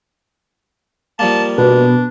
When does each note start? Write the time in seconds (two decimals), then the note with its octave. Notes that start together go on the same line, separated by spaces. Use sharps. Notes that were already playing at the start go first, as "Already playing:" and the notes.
1.19 F3 G3 A#3 A5
1.58 B2 D4 B4